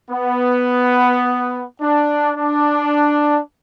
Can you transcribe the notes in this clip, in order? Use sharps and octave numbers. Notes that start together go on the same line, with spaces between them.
B3
D4
D4